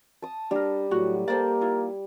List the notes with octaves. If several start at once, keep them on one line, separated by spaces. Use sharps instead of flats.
A5 D#6
G3 D4 A#4
A2 F#3 F#4
A#3 G4 A4 A#4 C5 D5
E4 F4